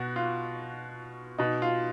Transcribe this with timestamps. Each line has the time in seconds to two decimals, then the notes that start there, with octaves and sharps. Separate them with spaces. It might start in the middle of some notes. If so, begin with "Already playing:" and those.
Already playing: B2 F#4
0.16 F4
1.38 B2 D#4
1.62 F4